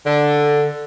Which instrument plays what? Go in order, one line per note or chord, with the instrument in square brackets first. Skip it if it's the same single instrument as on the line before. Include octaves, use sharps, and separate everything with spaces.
[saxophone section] D3